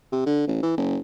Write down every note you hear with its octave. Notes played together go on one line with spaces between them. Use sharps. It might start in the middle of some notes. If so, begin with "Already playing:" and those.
C3
D3
A1
E3
F#1